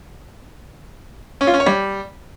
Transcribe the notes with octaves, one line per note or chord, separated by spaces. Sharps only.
C#4
F4
C#4
C#5
G3